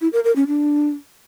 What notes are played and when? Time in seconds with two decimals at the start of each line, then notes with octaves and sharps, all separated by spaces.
0.01 E4
0.13 A#4
0.24 A#4
0.36 C#4
0.47 D4